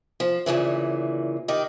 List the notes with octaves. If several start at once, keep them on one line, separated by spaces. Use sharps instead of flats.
F3
D2 A#2 C#3 E3
D#3 D#4 G4